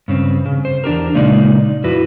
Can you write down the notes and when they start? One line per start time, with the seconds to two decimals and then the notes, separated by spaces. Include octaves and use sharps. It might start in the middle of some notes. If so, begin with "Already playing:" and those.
0.08 G2 C#3 C4
0.46 C#3
0.65 C5
0.84 E2 D4 G4 A#4
1.15 A#2 C#3 G#3 D#4 D5
1.84 F2 E4 F#4 B4